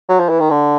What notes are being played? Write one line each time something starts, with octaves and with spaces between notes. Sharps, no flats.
F#3
F3
E3
D#3
D3